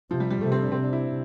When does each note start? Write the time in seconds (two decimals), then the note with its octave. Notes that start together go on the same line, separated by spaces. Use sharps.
0.10 C3 F3
0.20 G3
0.30 G3
0.41 C3 A3
0.52 C4
0.62 D4
0.72 C3 C4
0.82 D4
0.93 E4